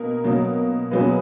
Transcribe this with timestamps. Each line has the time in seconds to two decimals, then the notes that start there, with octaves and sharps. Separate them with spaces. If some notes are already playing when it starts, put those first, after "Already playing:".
Already playing: B2 A#3 A#4
0.24 B2 F#3 A#3
0.91 B2 F#3 A#3 G#4 B4